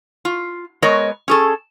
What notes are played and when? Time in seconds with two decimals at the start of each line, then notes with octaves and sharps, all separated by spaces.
0.25 F4
0.82 G#3 B3 A#4 C#5 D#5
1.28 C#4 G#4 A4